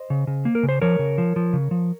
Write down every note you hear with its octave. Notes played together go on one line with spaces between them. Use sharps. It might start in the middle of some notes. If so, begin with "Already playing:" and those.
Already playing: C5 D#5
C#3
C#3
A#3
A#4
C#3
C5
F3 A#4 C#5
C#3
F3
F3
C#3
F3